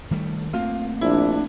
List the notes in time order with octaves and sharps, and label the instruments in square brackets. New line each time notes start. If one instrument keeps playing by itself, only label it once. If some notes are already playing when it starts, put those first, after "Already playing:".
[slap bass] D#3 G3 A3
[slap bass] A3 A#3 C4 [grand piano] F4
[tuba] A#1 [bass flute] D4 [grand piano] E4